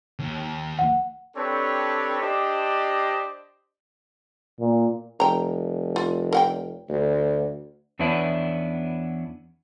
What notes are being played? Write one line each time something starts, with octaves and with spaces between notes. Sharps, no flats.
D#2
F#5
C4 D4 G4 A4 B4 C#5
D4 G4 C5 D5 D#5
A#2
F1 G5 A#5
F4
A#4 F#5 G5
D2
E2 B3 C#4 D4 E4